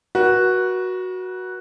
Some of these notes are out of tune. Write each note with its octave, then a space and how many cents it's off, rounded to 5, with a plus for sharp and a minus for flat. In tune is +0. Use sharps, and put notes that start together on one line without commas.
F#4 +0 B4 -45